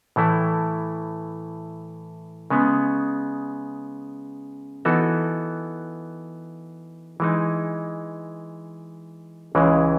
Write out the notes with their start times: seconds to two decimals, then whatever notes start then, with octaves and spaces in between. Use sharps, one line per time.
0.16 A2 E3 A3 E4
2.50 C#3 G#3 B3
4.85 E3 B3 D#4 F#4 A4
7.20 E3 G#3 D#4
9.55 C#2 C#3 E3 G#3